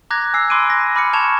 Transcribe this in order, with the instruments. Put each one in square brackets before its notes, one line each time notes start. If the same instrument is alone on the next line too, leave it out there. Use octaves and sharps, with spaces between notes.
[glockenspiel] A#5 D6 F#6 G#6 A#6
G#5 E6 C7
B5 C6 D6 F#6 D7 D#7
A#6
B5 D6 F6 A#6 C#7
A5 C#6 G#6 E7 F7